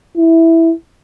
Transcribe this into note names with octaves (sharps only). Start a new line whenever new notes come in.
E4